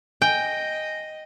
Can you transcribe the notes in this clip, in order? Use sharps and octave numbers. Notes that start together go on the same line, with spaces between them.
D#5 G5 G#5